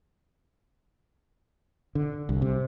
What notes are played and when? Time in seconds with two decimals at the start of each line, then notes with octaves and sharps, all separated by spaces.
1.95 D3
2.29 C2
2.42 C3